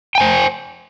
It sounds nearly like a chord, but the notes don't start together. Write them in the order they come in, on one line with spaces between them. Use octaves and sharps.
G5 G#5 C5